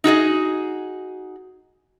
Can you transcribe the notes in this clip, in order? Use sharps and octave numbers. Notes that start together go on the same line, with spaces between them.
D#4 F#4 G#4 D#5